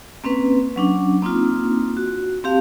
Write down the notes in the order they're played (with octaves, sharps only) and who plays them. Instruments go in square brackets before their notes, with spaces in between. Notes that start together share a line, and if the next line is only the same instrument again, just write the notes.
[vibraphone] A#3 C4 C#4 B4
F#3 C#4 D4
A#3 C4 D4 D#4 F4
F#4
C4 G4 F5 A5